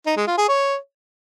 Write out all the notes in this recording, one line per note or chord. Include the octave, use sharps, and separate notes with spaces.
D#4
G#3
F4
G#4
C#5